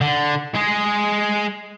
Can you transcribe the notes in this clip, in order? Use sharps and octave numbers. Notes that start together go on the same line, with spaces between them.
D3
G#3 G#4